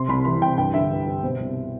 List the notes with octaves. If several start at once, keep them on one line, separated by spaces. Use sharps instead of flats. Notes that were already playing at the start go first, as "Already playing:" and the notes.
Already playing: C3 C6
C2 B5
E3 B5
C2 G5
G2 G5
D3 E5
G2
G2
B2 C5
C2